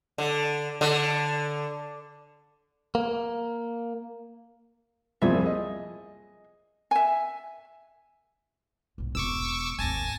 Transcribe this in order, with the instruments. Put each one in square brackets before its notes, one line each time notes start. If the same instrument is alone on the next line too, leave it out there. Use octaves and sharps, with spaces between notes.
[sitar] D3
D3
[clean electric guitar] A#3
[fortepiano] C2 F2 A#2 [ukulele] G#4 E5
[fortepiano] D#5
[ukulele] E5 G#5
[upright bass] B1 G#2
[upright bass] E1 [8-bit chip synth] C#6 D6 E6
[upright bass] G#1 D#2 [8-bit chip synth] G#5 A5 A#6